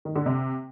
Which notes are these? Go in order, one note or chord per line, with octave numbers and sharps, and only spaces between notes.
D#3
D3
C3